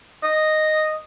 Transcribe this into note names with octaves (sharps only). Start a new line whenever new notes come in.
D#5